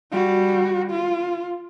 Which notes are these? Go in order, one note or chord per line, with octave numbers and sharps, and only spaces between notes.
G3 F#4
F4